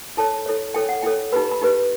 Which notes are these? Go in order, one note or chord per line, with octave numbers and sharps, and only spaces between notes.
E4 A4 C#5 A5
E4 A4 C#5
E4 A4 C#5 G5
F#5
E4 A4 C#5 G5
D#4 G4 B4 B5
A#5
B5
D#4 G4 B4